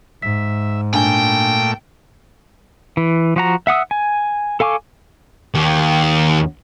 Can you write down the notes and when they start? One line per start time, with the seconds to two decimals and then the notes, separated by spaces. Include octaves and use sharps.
0.22 G#2 E5 B6
0.94 A#2 A3 D4 G5 G#5 G7
2.97 E3
3.36 F3 F#4 A#5
3.67 E5 F#5 D#6 E6
3.91 G#5
4.60 A4 F5 G#5 C#6 D6
5.55 D#2